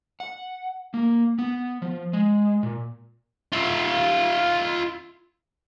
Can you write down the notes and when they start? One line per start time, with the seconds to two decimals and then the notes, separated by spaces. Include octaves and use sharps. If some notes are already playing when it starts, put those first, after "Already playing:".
0.20 F#5
0.94 A#3
1.39 B3
1.82 F3
2.13 G#3
2.63 A#2
3.52 F4 E5